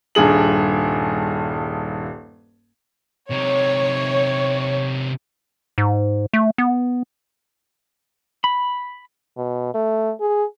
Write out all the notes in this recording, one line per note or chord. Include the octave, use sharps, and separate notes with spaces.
D#1 G2 G#4 F#7
C3 D#4 C#5
G#2
A3
B3
B5
B2
A3
G#4